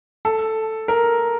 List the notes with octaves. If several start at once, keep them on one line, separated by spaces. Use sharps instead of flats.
A4
A#4